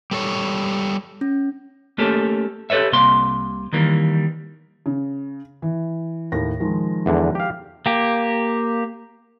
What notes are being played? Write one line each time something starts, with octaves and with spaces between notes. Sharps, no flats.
G3 A4 C#5
C#4
A3 A#3 C#4 G4 A4
G4 A4 B4 C#5 E5
C2 C3 A#3 F5 C6
D#3 E3 G3 A#3
C#3
E3
D#2 A2 A#6
D#3 F3 G#3
E2 D3
G4 F5
A#3 G4